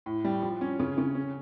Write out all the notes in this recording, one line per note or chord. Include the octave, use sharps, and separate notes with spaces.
A2
G3
F3
C#4
C#3
C#3
C#4